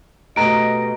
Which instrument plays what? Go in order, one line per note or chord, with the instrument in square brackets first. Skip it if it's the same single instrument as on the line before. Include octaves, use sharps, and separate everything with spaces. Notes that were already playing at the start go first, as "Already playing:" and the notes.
[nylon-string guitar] B2 A3 G4 [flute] D#5 [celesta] A#5 D7